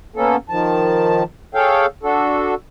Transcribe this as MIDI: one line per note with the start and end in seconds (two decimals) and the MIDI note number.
0.16 0.36 58
0.16 0.36 59
0.16 0.36 61
0.16 0.36 69
0.49 1.23 51
0.49 1.23 53
0.49 1.23 81
1.55 1.86 68
1.55 1.86 69
1.55 1.86 73
1.55 1.86 77
1.55 1.86 79
2.03 2.54 62
2.03 2.54 66
2.03 2.54 69